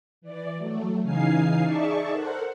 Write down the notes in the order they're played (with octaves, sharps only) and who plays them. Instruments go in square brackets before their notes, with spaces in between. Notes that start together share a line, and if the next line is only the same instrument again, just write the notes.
[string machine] E3 D5
F#3 A3
C#3 E3 D#4 F5 G#5 C7
D#4 G#4 D5 E5 A5 C#6
A4 A#4 C5 F#5